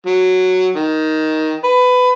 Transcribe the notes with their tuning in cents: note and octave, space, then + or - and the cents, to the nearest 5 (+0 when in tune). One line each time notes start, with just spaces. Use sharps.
F#3 +0
D#3 +10
B4 +20